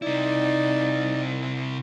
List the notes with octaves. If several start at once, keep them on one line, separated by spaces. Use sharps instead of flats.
C3 D#4 E4 D5